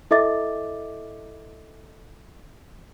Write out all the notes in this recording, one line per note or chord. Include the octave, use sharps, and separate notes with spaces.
E4 A4 D#5 E5 D6 A6